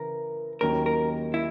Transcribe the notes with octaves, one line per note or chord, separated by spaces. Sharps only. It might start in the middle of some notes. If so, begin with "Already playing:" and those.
Already playing: C#3 E3 A#4
D#2 D#3 F#3 C#4 A#4
A#4
E4